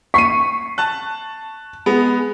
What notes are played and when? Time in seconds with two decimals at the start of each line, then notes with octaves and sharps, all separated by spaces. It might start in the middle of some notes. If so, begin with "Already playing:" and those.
0.14 C#6 B6 C7 D#7
0.78 A5 F#6
1.86 G#3 B3